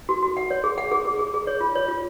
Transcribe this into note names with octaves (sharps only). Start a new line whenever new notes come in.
F#4
F#4
F#5
C#5
G#4
F#5
G#4
G#4
G#4
G#4
C#5
F4
C#5
F4